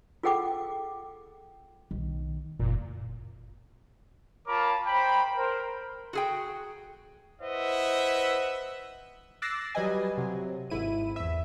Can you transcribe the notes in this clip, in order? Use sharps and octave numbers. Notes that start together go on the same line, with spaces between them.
F4 G#4 A4 F#5 G5 D6
B1 D#3
F#1 A#2
F4 A#4 C#5 A5 B5 D6
C5 G5 A#5 B5
A#4 C5
F#4 G#4 G5
E4 B4 C5 D#5 E5 F#5
D6 E6 F#6 A6 A#6 C7
F#3 G3 B4 D#5 G#5
C3 F#3
G#1 G#2 E4 D#7
E2 E5